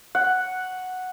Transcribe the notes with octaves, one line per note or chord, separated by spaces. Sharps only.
F#5